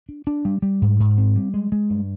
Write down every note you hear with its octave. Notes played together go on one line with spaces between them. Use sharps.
D4
D4
G3
G3
G#2
G#2
C4
G3
G#3
G#3
G2